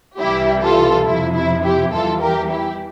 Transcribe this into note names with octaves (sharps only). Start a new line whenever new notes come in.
C2 C3 E3 G3 E4 G4
F4 A4
F2 C3 F3 E4
E4
E4 G4
E2 E3 G3 F4 A4
G4 A#4
E4 G4